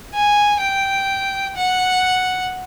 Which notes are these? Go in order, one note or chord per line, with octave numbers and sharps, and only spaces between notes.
G#5
G5
F#5